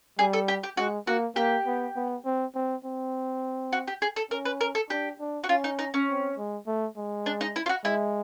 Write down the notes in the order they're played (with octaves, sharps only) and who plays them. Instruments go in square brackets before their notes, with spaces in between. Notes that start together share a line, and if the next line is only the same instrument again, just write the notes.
[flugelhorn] G3 [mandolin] G#4
[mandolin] A4
G4
G4
[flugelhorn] G#3 [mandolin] F#4
[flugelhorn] A#3 [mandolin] F#4
[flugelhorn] A#3 [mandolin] G4
[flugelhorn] B3
B3
C4
C4
C4
[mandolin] F#4
G4
G#4
A4
[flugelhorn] C#4 [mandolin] A#4
[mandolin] B4
A#4
A4
[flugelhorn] D4 [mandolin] G4
[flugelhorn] D4
[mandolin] F#4
[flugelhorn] C#4 [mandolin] F4
[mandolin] D#4
D#4
C#4
[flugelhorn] C4
G#3
A3
G#3
[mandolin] D4
D#4
E4
F4
F#4
[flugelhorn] G#3 [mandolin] E4